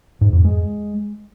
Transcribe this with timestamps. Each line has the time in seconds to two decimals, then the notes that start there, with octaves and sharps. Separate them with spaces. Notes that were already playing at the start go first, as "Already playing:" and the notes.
0.21 G#2
0.33 F2
0.44 G#3